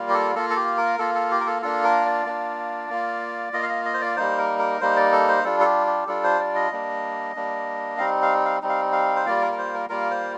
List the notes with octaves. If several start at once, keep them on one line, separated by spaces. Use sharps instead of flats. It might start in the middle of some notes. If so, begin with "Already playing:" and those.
Already playing: G3 A#3 F4
G4
A4
A#3 F4 A4
A4
G4
A#4
A#3 F4 A4
A4
G4
A#4
A4
A#3 D4 F4 A4
A#4
D5
A#3 D4 F4
A#3 F4
A#3 F4 D#5
F5
D#5
D#5
C5
D5
G3 A#3 D#4 C5
A#4
A#4
G3 A#3 D#4 C5
D5
A4
C5
G3 D4 F4 A4
A4
G4
G4
G3 D4 F4 A4
C5
D5
D#5
G3 A#3 D4
G3 A#3 D4
G3 C4 D#4 F5
F5
F5
G3 C4 D#4
F5
F5
C5
G3 A#3 F4 D5
A#4
A#4
C5
A#4
G3 A#3 F4 A#4
C5